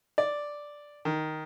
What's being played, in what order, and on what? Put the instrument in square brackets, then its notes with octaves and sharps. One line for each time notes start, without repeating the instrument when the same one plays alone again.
[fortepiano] D5
D#3